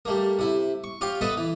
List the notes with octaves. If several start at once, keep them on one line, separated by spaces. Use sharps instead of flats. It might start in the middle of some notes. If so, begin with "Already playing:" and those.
G3 A3 A#3
C3 E4
C#6
F4 G4 C#5 F5 G5
B3 A4 B4 D#5 E5
E3